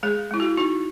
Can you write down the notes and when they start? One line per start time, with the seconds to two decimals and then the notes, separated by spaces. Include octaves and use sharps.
0.03 G#3 G#4
0.31 G#3 E4
0.40 F#4
0.57 D#4 F#4